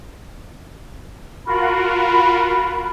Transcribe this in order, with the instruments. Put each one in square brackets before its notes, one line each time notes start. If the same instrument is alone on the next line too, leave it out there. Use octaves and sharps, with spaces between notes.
[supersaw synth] F4 F#4 A#4 [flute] B5